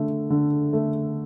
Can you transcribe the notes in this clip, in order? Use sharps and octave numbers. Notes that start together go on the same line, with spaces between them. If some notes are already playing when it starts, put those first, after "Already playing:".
Already playing: D3 A3
D3
A3